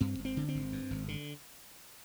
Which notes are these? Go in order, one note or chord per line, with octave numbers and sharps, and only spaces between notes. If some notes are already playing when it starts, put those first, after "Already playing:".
G2 C4
G#1
C4
D3
C4
G#1
G2
G#1
D3